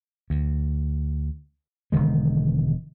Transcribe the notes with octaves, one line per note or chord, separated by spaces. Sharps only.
D2
E1 D3 D#3 G#3